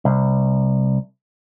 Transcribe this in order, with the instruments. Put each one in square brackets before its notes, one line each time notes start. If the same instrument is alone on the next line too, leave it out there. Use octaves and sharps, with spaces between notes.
[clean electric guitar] C2